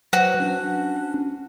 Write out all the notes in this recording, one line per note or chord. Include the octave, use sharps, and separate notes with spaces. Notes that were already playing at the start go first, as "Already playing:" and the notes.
F#3 F#4 B4 C5
C#4 D4